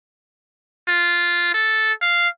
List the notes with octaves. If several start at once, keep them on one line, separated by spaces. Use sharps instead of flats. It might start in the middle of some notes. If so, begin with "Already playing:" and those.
F4
A4
F5